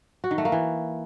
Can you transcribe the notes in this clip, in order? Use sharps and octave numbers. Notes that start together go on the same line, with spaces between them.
F#4
D#3
A3
A#3
E3